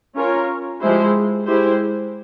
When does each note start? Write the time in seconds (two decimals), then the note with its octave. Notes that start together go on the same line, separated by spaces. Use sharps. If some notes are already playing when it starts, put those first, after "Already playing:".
0.17 C#4 F4 A#4 C#5
0.81 F3 G#3 E4 G4 C5
1.46 G#3 E4 G4 C5